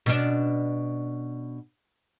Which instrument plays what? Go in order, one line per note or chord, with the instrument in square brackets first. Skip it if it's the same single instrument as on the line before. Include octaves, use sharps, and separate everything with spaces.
[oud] B2 C#4 D4